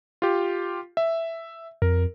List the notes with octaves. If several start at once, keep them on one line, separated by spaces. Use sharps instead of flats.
F4 G4
E5
F2 A#4